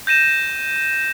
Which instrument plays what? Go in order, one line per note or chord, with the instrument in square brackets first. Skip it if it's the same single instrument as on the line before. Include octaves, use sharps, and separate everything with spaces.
[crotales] G6 A#6 D#7 E7